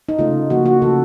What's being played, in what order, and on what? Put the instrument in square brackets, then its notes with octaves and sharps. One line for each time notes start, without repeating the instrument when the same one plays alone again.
[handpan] D#4
C#3 A3 F4
C#3 F3 A#3 F#4
F#4
C#3 F3 A3 A4